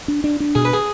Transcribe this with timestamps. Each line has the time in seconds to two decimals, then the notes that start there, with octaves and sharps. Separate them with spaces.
0.08 D4
0.24 D4
0.40 D4
0.55 B2 G#4
0.65 B4
0.73 G#4